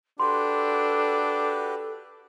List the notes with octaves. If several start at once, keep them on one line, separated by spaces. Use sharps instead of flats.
D4 F#4 G4 A4 B4 C6